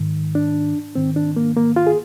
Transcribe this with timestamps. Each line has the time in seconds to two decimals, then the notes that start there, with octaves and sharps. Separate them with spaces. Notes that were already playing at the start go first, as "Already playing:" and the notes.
Already playing: G#2 D#3
0.35 D4
0.96 G#2 D#3 C4
1.16 D4
1.36 A#3
1.57 A#3
1.76 F4
1.87 G#4